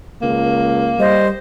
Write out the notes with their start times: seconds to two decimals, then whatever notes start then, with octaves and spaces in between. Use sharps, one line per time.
0.22 C#2 A#3
0.99 G3 C5 D#5